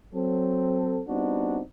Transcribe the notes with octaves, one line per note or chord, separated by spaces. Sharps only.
F#3 C4 A4
G3 B3 C4 D4 D#4 F#4